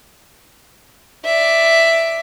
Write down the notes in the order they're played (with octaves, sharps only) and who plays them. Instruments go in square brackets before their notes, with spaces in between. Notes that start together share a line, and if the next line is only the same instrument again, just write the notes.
[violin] D5 E5